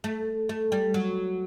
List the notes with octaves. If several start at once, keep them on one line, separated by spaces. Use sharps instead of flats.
A3
A3
G3
F#3